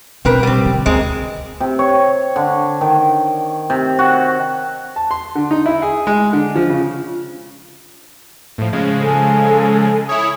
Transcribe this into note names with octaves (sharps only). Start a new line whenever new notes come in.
B2 C4 A#4 B4
G3 C4
D3
D2 A#2 G#3 C4
C3
C#5
D3
D#3
C3
F#4
A5
C6
D3
D#4
E4
G#4
G#3
D3
F3
C#3
A2 F3
C#3 F3 G#3
A4 G#5
E4 C#5 D#6